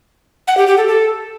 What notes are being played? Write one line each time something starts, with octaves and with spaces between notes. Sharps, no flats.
F#5
G4
G4
A4
A4